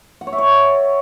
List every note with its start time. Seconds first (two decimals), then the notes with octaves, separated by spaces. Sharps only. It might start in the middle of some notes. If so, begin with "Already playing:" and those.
0.21 F#5
0.27 C#5
0.33 E5
0.38 C#5